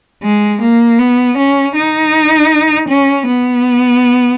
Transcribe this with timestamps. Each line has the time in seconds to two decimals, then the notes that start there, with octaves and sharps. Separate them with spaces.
0.24 G#3
0.62 A#3
0.99 B3
1.37 C#4
1.75 D#4
2.89 C#4
3.27 B3